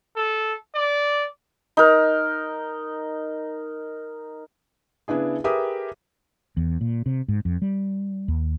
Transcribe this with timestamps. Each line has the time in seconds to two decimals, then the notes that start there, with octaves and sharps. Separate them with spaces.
0.16 A4
0.75 D5
1.77 D#4 A#4
5.08 C#3 B3 D4 E4 G#4
5.44 G4 G#4 A#4 B4 E5 D#6
6.57 E2
6.81 A#2
7.06 C3
7.28 G#2
7.45 F2
7.62 G3
8.28 D#2